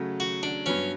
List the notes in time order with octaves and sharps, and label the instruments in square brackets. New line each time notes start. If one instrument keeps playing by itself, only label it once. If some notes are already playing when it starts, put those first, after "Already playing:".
Already playing: [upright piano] C#3 F#3 A3
[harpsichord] F#4
D4
[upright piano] G2 F#3 B3 [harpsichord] C#4